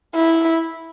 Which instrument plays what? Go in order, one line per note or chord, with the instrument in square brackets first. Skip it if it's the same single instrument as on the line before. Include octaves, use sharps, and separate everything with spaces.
[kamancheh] E4